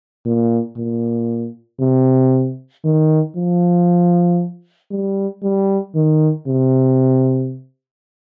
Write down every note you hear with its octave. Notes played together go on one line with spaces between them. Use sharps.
A#2
A#2
C3
D#3
F3
G3
G3
D#3
C3